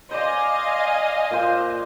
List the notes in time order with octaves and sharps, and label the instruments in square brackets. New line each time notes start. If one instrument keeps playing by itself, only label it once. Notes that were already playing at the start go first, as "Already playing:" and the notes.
[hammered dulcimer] C5 D5 [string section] D#5 F5 G#5
[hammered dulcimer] A#2 C5